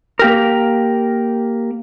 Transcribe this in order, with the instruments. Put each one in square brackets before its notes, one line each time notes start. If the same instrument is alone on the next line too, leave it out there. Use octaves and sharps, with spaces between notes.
[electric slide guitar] A#3 G4 A#4